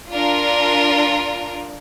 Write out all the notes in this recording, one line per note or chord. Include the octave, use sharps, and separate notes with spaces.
D4 F4 A#4